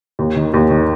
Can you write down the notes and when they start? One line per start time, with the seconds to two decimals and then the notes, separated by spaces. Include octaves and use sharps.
0.19 D#2
0.36 D#3
0.54 D#2
0.70 D#3